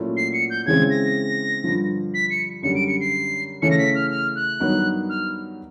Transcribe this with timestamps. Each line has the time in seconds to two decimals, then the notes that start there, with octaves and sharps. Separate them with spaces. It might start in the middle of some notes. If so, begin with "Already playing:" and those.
Already playing: A#2 F#3 A3 C#4 E4
0.16 C7
0.33 C#7
0.50 G6
0.66 C#3 E3 G#3 C4 G#6
0.90 A#6
1.64 G2 D3 F3
2.14 B6
2.30 C#7
2.62 F#2 D3 G3 C#7
2.75 D7
2.87 C#7
3.00 C7
3.62 C#3 E3 A3 C#4 C#7
3.70 A#6
3.78 B6
3.95 F6
4.10 F6
4.35 F#6
4.60 G2 D#3 F#3 B3 D#4
5.09 F6